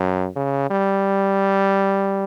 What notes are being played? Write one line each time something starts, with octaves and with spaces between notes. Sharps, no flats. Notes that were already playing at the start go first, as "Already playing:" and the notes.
Already playing: F#2
C#3
G3